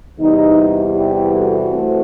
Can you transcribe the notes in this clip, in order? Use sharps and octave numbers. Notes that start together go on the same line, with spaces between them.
E2 C3 E3 G3 D#4
E4 G4
F#4 A4
E3 A3 C4